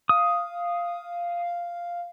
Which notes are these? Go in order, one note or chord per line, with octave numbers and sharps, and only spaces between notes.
F5 D#6